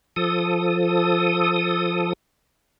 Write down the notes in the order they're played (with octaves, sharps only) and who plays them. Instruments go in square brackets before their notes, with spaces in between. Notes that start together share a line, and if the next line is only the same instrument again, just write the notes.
[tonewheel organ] F3 A4 D#6